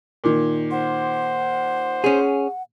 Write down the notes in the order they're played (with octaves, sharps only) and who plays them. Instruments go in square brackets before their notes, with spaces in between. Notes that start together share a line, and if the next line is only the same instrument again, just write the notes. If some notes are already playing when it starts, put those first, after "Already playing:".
[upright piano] A#2 D#3
[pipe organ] C5 [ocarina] F#5
[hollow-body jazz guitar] C#4 G#4